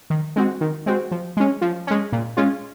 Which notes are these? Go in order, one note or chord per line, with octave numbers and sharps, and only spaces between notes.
D#3
G#3 C4 F#4
D#3
G#3 C4 F#4
F3
G#3 C#4
F3
G#3 C#4
A#2
G#3 C#4 F4